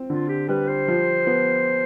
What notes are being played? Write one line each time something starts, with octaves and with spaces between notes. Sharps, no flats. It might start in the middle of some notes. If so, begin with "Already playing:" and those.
Already playing: C4
D3 F4
G4
G3 B4
C5
F3
B3